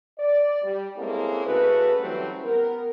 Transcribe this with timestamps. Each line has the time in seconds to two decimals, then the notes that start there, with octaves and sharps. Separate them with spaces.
0.18 D5
0.62 G3
0.97 G#3 A#3 C4 C#4 E4 A4
1.45 C#3 A3 F#4 B4
2.00 E3 F#3 G3 A3 C4 C#4
2.44 B3 A#4